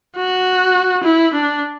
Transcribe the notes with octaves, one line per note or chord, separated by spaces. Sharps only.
F#4
E4
D4